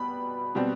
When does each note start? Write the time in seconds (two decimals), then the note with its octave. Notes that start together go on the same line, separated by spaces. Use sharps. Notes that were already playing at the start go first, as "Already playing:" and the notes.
Already playing: B2 G3 B3 B5
0.55 B2 G3 C4